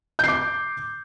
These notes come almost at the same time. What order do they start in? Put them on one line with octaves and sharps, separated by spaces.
G6 C7 D6